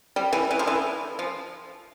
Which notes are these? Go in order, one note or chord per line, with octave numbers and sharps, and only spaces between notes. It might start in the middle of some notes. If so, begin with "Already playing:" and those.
G3
E3
E3
F3
E3
F3